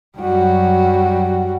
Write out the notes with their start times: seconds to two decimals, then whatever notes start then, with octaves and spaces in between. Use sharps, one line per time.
0.17 F#2 F#3 G3 F#4